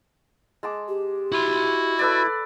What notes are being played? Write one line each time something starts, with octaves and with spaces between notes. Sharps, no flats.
G#3 A5 D6
G4
E4 F#4 C6
A4 B4 D5